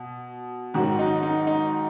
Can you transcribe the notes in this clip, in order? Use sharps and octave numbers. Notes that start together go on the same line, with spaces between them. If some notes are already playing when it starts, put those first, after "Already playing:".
Already playing: B2
G#2 D#3 F#3 F#4
D#4
D#4
D#4